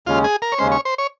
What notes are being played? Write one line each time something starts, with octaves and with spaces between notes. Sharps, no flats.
D#2 C#3 G#3 C#4 F4
G#4
A#4
C#5
D#2 C#3 G#3 C#4 C5
C#5
C5
C#5